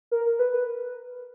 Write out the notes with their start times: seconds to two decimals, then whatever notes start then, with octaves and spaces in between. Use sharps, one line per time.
0.11 A#4
0.39 B4